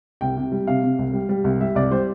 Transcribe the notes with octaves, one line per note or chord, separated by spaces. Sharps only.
C2 G5
C3
G3
C3 F5
C3
C2
G3
G3
C2
G3 E5
C2 D5
G3 C5